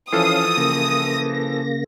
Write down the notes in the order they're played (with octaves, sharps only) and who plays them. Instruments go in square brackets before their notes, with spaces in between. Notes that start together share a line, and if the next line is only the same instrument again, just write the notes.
[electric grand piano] E3 F3 A4 [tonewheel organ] C#4 F5 [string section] D#6
[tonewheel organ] C#3 A#3 A#6